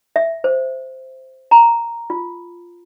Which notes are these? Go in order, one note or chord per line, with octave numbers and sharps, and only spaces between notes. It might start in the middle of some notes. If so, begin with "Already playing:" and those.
E5
C5
A#5
F4